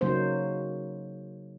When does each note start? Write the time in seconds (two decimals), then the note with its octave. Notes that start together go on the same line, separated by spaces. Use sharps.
0.01 C#3 F#3 A#3 D#4 C5